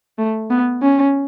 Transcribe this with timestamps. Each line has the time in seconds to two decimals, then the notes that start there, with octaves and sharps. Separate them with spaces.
0.18 A3
0.51 B3
0.83 C#4